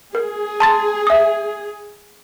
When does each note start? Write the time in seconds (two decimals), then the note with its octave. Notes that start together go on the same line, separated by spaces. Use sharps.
0.15 G#4 A#4
0.60 A5 C6 A6
1.07 E5 D#6